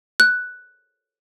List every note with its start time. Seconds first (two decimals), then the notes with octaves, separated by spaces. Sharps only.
0.20 F#6